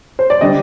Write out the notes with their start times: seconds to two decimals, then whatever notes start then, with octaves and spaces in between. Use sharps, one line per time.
0.19 C5
0.30 D5
0.41 D3 G3 D4 D#5